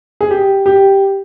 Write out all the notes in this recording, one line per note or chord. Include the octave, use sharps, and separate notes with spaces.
G#4
G4
G4